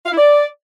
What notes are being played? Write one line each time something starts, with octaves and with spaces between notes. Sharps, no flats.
F5
E4
D5